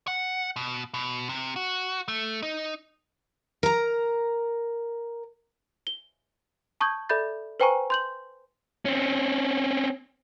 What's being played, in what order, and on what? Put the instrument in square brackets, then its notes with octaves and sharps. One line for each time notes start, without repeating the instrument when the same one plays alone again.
[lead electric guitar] F#5
B2
B2
C3
F#4
A3
D#4
[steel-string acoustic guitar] A#4 A#5
[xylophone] G7
A5 C#6 D#6 G6 G#6
A4 D5 E5 B5 G6 A6
B4 C5 G5 G#5 A#5 C#6
C6 G6 F#7
[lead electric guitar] C4 C#4